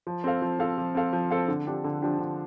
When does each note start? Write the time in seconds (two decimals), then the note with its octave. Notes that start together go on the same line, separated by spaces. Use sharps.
0.07 F3
0.24 C4 A4 F5
0.42 F3
0.59 C4 A4 F5
0.78 F3
0.95 C4 A4 F5
1.13 F3
1.30 C4 A4 F5
1.48 D3
1.67 F3 D4 G4
1.84 D3
2.02 F3 D4 G4
2.19 D3